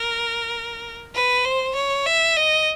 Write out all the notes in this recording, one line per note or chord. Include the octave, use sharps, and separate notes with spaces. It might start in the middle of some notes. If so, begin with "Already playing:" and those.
Already playing: A#4
B4
C5
C#5
E5
D#5